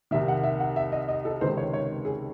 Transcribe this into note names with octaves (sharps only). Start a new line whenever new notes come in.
C2 C3 D#3 E5
F#5
E5
F#5
E5
D#5
D#5
A4
C#2 C3 D#3 C5
C#5
C#5
G#4